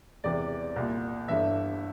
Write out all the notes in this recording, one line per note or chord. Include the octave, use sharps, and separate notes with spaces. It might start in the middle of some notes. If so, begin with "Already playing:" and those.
E1 E2 C3 E3 D5
C2 A#2
G1 G2 E3 E5